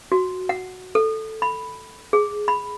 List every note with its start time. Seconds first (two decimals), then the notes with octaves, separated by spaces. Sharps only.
0.12 F#4
0.49 F#5
0.95 A4
1.42 B5
2.13 G#4
2.48 B5